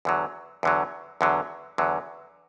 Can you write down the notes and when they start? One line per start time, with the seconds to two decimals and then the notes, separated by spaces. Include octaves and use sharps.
0.05 E2 D3 F#3
0.63 E2 D3 F#3
1.21 E2 D3 F#3
1.78 E2 D3 F#3